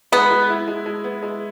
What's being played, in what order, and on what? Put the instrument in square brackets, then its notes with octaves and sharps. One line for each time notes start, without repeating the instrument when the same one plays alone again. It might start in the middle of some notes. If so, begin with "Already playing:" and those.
[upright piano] G#3 [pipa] B3
[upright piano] G#3
E4
G#3
G#3
B3
G#3